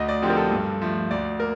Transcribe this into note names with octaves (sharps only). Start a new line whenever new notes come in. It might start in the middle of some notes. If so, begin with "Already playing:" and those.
Already playing: D2 D#5
D5
D3 F3 C4 G4
A#4
A4
G2
F3 A3
D2 D5
A#3 A#4